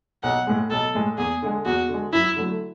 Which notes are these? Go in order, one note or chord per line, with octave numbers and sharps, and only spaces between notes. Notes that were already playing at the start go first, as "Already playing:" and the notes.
B1 F#5
A2 G#3
B1 A4
A2 G#3
E2 G#4
D3 G#3
E2 F#4
D3 G#3
F#2 E4
D3 F#3 A3